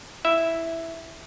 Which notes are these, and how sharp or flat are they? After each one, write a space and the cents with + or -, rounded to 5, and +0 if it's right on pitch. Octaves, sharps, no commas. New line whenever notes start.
E4 +0 E5 +0